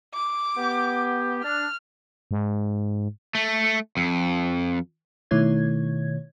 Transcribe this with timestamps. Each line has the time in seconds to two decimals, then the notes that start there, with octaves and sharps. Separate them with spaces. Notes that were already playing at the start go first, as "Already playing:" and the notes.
0.14 D6
0.57 B3 G4
1.44 D4 F6
2.31 G#2
3.35 A3
3.97 F2
5.31 B2 D#3 A3 E4 C#5 G#6